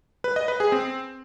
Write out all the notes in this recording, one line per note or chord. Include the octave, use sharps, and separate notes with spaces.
B4
D#5
B4
G#4
C4